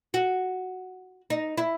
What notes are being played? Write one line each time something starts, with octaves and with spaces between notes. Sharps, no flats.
F#4
D#4
E4